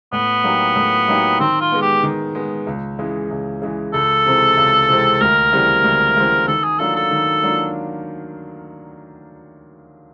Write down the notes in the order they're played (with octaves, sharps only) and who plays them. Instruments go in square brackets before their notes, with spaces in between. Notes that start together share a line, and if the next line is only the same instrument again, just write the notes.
[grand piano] A2 [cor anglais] B3
[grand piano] F#3 A#3 D#4 G4
A2
F#3 A#3 D#4 G4
[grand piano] D#3 [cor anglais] C4
[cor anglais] F4
[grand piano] G#3 B3
[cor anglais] G4
[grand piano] D#3
G#3 B3
C#2
C#3 E3 G#3
C#2
C#3 E3 G#3
[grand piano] C#2 [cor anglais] A4
[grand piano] C3 E3 G#3 C4
C#2
C3 E3 G#3 C4
[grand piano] D2 [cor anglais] A#4
[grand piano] C#3 E3 G3 C4
D2
C#3 E3 G3 C4
[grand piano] D#3 [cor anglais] A4
[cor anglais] G#4
[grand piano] F#3 A#3 D4 F4 [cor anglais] A4
[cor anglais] A4
[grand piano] D#3
F#3 A#3 D4 F4